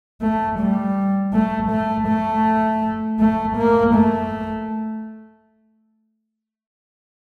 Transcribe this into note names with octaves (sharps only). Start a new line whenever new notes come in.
A3
G3
A3
A3
A3
A3
A#3
A3